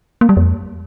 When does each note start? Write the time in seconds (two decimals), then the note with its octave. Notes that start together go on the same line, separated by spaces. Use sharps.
0.21 A#3
0.29 G3
0.37 F2